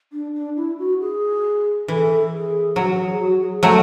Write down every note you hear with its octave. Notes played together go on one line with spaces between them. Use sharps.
D4
D4
E4
F#4
G#4
E3 A4
G#4
F#3 F#4
G#4
F#4
G#4
F#3 A3 A4